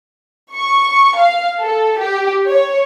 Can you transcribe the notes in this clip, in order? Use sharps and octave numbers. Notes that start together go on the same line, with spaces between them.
C#6
F5
A4
G4
C#5